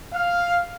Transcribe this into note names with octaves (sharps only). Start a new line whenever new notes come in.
F5